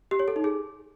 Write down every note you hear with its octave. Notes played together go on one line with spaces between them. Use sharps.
G4
C#5
A4
D#4
G#4